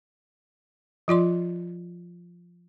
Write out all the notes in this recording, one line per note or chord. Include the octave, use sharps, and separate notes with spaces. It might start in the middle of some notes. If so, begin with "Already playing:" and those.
F3 F4 D5 C6